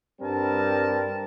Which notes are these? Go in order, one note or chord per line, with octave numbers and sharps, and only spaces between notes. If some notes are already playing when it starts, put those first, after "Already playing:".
G2 G3 C4 A#4 A5